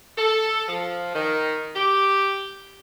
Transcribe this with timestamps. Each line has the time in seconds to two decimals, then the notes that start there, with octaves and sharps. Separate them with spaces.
0.18 A4
0.67 F3
1.15 D#3
1.75 G4